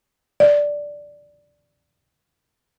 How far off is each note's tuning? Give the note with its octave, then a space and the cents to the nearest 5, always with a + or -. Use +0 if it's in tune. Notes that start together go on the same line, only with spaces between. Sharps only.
D5 -5